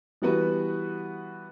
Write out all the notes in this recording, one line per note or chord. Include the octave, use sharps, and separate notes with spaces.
E3 G3 B3 F#4 B4